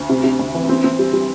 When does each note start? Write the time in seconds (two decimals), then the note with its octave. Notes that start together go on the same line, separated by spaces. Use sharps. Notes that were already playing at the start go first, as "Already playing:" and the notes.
Already playing: D2
0.09 C3
0.24 C3
0.39 D2
0.54 E3
0.69 C4
0.84 C4
0.99 G3
1.13 G3